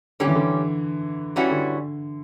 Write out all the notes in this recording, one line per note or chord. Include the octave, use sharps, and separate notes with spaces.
D3 G3 C#4 G4
E3
D3
E3 G3 C#4 F#4
D3